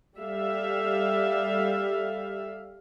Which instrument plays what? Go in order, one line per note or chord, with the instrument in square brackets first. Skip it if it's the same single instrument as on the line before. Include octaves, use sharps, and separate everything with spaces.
[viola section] G3 G4 A4 E5 F5